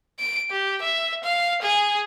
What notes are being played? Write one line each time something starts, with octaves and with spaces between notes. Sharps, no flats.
D7
G4
E5
F5
G#4